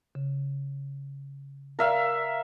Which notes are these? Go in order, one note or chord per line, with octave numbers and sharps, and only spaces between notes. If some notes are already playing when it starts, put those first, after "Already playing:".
C#3
A#4 E5 F5